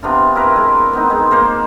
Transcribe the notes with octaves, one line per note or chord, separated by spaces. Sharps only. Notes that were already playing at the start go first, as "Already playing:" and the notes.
C3 B3 D4 F4
E4 A#4 B4
G#3
B3 C4 D#4
G#3
A#3 F4 C5